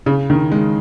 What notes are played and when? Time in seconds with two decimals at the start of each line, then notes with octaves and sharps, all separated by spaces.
0.06 C#3
0.30 D#3
0.52 G#3